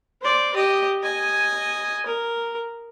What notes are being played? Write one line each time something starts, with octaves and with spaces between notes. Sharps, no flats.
C5 D5
G4 D#5
D#5 G#5
A#4